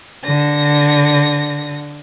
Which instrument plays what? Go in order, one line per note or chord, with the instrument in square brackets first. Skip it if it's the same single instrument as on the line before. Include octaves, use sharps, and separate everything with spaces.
[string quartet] D3 A#6